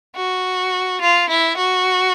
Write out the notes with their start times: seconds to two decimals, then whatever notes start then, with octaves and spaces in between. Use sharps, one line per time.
0.16 F#4
1.01 F4
1.30 E4
1.57 F#4